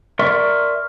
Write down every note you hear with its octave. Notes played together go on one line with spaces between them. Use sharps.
A#4 D5 E5 C6 C#6